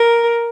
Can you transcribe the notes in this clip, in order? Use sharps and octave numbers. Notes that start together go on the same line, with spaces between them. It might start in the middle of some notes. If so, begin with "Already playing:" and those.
Already playing: A#4